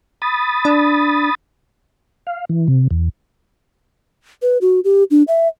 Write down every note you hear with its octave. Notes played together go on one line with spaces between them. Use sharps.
B5 D#6 A6
D4
F5
E3
C3
E2
B4
F#4
G4
D4
E5